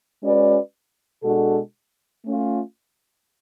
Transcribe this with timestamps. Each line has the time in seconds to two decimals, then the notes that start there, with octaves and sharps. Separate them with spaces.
0.23 G#3 C#4 F#4 B4 D5
1.23 B2 G#3 D4 F#4 A4
2.25 A3 C#4 F4